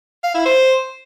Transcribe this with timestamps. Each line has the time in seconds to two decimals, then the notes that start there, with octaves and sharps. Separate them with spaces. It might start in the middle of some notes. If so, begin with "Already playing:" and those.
0.23 F5
0.34 E4
0.45 C5